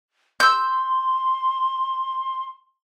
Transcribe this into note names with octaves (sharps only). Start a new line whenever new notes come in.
C6 E6 G6